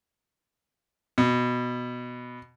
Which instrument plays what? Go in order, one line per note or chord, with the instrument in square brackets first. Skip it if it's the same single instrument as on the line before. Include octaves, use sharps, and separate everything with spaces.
[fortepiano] B2